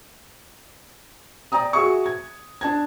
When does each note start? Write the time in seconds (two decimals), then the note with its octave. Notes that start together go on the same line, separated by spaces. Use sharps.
1.52 D5 G5 A#5 D#6
1.73 F#4 G#4 E5 C#6
2.06 G#6
2.61 D4 A5 G#6